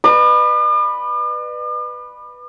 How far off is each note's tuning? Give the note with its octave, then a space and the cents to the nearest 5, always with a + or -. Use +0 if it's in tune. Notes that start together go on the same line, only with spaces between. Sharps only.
B4 +0 D5 +45